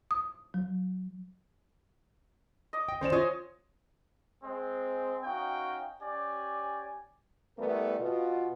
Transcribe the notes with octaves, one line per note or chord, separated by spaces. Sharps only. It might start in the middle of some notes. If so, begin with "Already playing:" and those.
D#6
F#3
D#5 D6
G5
D#3 C#4 C5 D5 E7
F4 C#5 D#5 G#5
G#3 C4
C#4 D#4 F#4 F5 G5
C#4 G4 D5 G#5
E3 G3 A3 B3 A#4
B2 F4